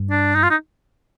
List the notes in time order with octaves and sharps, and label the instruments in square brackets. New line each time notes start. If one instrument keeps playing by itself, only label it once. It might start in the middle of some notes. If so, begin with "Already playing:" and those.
Already playing: [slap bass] G2
[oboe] D4
D#4
F4
D#4